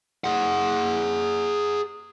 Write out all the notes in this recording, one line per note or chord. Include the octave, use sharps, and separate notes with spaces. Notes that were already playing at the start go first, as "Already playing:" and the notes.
G#4 F#5